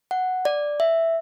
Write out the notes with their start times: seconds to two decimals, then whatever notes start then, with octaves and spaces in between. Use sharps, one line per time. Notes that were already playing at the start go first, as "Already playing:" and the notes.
0.11 F#5
0.45 D5
0.80 E5